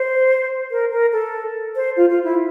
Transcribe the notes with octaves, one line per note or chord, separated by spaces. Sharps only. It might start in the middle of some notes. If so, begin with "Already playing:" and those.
Already playing: C5
A#4
A#4
A4
C5
F4
F4
E4